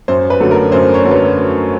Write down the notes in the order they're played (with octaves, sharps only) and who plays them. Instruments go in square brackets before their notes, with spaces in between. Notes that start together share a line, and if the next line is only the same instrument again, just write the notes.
[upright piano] F#2 C5
B4
D3 F#3 A3
A#4
F#2 C5
C#5
D3 F#3 A3
B4